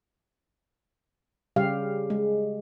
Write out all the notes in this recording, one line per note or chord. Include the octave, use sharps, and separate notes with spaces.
C#3 G3 G4 F5
G#3